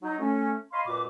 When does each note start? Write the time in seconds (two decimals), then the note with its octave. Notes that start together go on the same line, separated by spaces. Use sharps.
0.02 F#3 D#4
0.20 A3 C#4
0.73 C#5 D#5 F5 B5 C6
0.86 F#2 A#2 G#3 F#4 B4 D6